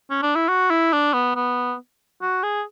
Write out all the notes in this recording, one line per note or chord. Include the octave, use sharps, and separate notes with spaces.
C#4
D4
E4
F#4
E4
D4
B3
B3
F#4
G#4